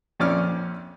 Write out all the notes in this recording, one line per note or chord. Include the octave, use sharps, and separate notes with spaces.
A#1 F2 C#4 D5 D6 F6